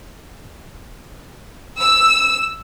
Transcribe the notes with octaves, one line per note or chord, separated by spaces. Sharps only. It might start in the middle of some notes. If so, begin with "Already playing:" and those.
E6